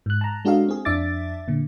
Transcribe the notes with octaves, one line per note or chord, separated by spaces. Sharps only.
G#2 F#6
A5 A#5
G#3 D4 F#4 A4 D#5 F5
C4 G#4
F2 D4 E5 D6 A6
A#2 D3